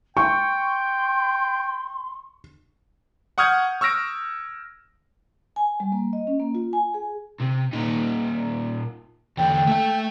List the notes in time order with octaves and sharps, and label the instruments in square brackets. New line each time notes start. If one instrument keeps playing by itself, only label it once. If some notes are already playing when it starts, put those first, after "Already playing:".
[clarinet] G5 [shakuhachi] C6 [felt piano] C#6
[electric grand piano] F#5 C#6 D#6 F6 G6 G#6
C#6 E6 F6 A#6 D7
[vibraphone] G#5
G3
A#3
D#5
C#4
A#3
F4
G#5
G#4
[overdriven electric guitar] C3
A#2 D#4
[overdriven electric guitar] E2 D3 [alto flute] G5
[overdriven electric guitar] A3 E5